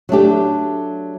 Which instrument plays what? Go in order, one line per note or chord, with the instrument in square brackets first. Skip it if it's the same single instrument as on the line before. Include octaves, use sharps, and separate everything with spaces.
[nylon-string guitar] F#3 A3 D4 G4